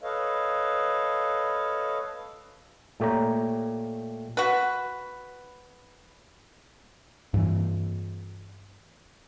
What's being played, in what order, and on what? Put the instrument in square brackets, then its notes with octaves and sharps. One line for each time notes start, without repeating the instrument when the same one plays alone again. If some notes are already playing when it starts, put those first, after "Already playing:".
[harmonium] A4 B4 C#5 D#5 F5
[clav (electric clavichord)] A#2 A3 G4 C#5 A#5
[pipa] F#4 B4
[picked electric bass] G2 E3